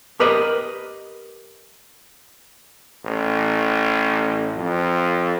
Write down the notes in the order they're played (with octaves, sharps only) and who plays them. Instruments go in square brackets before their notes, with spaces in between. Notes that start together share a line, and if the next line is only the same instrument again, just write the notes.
[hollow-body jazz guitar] G4 A#4 B4 D#5
[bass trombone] A1
F2